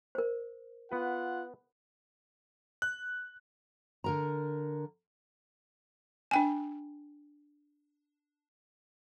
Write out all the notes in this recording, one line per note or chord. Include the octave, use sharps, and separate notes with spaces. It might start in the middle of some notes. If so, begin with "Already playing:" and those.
A#4 C5
B3 F4 B4 F#5
F#6
D3 A#4 A#5
D4 G5 G#5